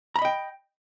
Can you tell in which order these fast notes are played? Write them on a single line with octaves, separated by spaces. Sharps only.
A#5 B5 D#5 G5